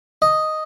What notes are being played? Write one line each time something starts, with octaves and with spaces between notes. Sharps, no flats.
D#5